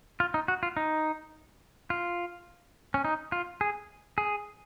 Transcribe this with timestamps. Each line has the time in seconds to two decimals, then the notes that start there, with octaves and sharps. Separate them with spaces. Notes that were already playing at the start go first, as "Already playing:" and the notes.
0.20 F4
0.34 D#4
0.48 F#4
0.63 F4
0.77 D#4
1.90 F4
2.94 C#4
3.05 D#4
3.32 F4
3.61 G#4
4.18 G#4